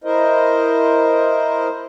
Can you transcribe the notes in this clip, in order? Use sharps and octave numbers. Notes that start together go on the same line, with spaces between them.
E4 A#4 C5 D#5